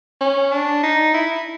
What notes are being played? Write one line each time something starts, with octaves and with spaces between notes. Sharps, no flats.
C#4
D4
D#4
E4